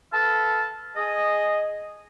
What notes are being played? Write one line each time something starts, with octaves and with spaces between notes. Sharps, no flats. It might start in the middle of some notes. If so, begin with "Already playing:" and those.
A4 B4 F5 A5
G#4 D#5